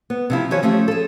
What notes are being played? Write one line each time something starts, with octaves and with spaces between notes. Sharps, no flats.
B3
C3 F3 E4
C3 E3 F3 C#5
F3 A3 C#4 G4
G#4 A4